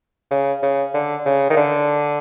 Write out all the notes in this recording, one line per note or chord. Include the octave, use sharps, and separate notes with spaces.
C#3
C#3
D3
C#3
D#3
D3